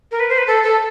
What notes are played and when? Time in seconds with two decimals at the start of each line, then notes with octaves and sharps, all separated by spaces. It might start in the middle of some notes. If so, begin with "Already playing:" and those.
0.11 A#4
0.20 B4
0.29 C5
0.38 B4
0.47 A4
0.63 A4